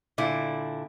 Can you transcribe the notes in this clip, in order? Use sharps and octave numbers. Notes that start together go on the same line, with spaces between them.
A#2 D3 E4